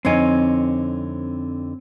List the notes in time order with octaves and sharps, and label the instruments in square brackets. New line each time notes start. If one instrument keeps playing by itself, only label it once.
[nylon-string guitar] F2 D3 D#4 [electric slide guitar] C4 C#5 G#5